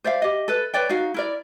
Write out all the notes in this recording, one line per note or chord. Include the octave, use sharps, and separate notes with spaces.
C5 D5 E5 F5
G4 D#5
A4 B4
B4 C#5 D5 G5
D#4 F#4 F5
E4 A#4 D5